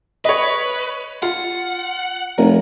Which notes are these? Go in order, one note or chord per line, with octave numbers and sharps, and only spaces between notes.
B4 C#5 D#5
F4 F#5
F1 A#4